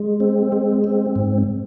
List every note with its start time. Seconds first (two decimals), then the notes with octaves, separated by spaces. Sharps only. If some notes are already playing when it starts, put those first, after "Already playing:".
Already playing: G#3
0.20 C4
0.52 G#3
0.84 C4
1.16 G#2